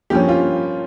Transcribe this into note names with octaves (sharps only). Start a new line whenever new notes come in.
G2 F3 A#3 C#4 G4
F4